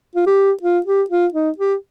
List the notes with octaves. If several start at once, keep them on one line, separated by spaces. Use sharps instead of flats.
F4
G4
F4
G4
F4
D#4
G4